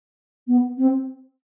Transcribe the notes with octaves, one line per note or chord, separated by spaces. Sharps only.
B3
C4